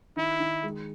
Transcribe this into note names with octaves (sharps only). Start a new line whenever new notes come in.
D#3 E4
D#3
G#3